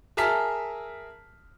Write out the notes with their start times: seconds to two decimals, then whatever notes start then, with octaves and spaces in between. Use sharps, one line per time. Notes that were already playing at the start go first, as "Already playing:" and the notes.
0.17 G#4 A#4 E5 A5 F6 B6